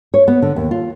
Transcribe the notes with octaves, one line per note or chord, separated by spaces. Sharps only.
C#5
B3
D3
D#2
F4